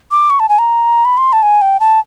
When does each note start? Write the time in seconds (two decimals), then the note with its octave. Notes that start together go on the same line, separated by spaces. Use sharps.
0.11 D6
0.30 C#6
0.40 A5
0.49 G#5
0.59 A#5
1.05 B5
1.18 C6
1.33 A5
1.43 G#5
1.62 G5
1.80 A5